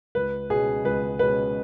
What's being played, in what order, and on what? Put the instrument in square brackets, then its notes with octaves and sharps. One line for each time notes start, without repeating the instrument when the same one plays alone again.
[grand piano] C#2 B4
B2 G#3 C#4 G#4
C#2 B4
B2 G#3 C#4 B4